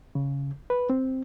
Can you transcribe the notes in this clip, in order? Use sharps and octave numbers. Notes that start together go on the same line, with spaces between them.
C#3
B4
C4